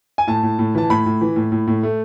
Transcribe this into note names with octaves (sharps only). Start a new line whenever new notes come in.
G#5
A2 A5
A2
A2
E3 A5
A2 B5
A2
E3
A2
A2
A2
A3